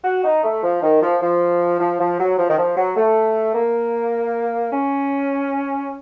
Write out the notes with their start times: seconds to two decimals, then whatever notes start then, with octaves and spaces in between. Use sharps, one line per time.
0.04 F#4
0.24 D#4
0.43 A3
0.63 F3
0.82 D#3
1.02 F3
1.21 F3
1.80 F3
1.99 F3
2.19 F#3
2.38 F3
2.50 D#3
2.58 F3
2.77 F#3
2.96 A3
3.55 A#3
4.72 C#4